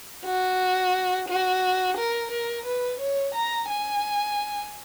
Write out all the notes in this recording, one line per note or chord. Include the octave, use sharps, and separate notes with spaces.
F#4
F#4
A#4
A#4
B4
C#5
A#5
G#5